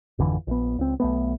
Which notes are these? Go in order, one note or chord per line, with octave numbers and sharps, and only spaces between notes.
G#1 F2 D3 E3
A#1 B3
C#2 C4
B1 A3 B3